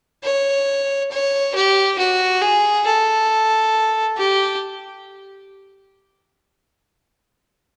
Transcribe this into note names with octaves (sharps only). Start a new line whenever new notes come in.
C#5
C#5
G4
F#4
G#4
A4
G4